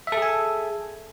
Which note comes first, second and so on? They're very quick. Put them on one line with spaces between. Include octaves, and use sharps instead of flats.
E5 A4 G#4 G#5